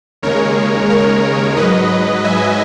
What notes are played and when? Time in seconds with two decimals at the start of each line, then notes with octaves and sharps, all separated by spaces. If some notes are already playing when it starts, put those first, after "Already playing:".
0.22 D#2 C#3 G#3 A#4 C#5
0.90 A#4 C#5
1.56 G#2 F#3 B4 D#5
2.24 E5 G#5